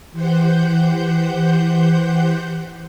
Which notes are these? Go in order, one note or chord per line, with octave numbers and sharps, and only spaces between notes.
E3 G4 C5 F#5 G6